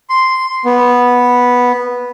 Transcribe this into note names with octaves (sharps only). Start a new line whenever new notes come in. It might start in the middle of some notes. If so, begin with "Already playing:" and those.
C6
B3